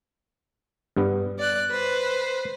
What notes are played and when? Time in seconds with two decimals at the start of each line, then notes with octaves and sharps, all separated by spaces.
0.97 G2 G3 B3
1.39 D5 F#6
1.71 B4 C5